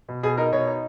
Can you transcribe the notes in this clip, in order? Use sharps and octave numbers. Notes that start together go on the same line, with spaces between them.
B2
B2 G#4
D#4 A#4
B2 C#5
D#4